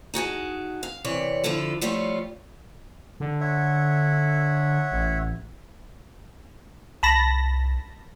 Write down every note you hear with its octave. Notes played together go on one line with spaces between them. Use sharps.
D#4 F#4 G#4 A5
F5
C3 E3 C#5 D5
D3 F3 E4 F4 A4
F3 G3 A3 F4 C#5
D3
C#5 E5 F#5
A1
C2 A5 B5 A#6